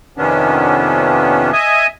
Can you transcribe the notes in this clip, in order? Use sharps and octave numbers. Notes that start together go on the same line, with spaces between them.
F2 C3 D#3 B3 C#4 D4
D#5 E5 G#5 D#6